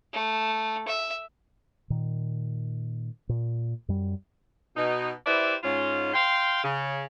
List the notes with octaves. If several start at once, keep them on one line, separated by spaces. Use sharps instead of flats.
A3
E5
A#2 D#3
A#2
F#2 G3
B2 D#4
E4 G4 B4 C5 D5 E5
G#2 C#4 F4
F5 G5 C6
C#3